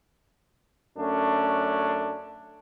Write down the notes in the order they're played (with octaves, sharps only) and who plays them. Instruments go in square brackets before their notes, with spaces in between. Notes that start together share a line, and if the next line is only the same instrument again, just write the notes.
[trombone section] F#2 A3 C#4 D4